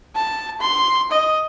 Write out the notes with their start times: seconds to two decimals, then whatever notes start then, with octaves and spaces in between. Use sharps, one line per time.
0.15 A5
0.61 C6
1.11 D#5